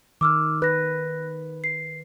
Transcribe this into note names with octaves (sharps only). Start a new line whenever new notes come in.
D#3 D6 E6 F6
B4 F#6 A#6
C7